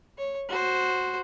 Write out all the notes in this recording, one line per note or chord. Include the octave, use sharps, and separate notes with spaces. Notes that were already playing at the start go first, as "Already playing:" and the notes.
C#5
F#4 C5